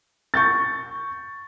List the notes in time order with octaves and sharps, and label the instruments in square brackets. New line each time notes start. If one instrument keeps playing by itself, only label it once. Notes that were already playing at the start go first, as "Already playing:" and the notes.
[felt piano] C#6 G6 A6